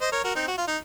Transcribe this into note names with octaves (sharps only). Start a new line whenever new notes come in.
C5 D#5
A#4 C#5
F#4 A#4
C4 D#4
F#4
F4
D#4